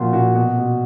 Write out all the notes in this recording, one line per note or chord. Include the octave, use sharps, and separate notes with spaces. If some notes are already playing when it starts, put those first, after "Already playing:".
Already playing: A#2 F3 F4 F#4
A#2 F#4
B2 F#4
B2